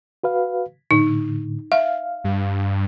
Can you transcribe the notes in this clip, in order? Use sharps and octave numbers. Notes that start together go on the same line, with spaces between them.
F#4 B4 F5
A2 D3 D#4
E5 F5
G2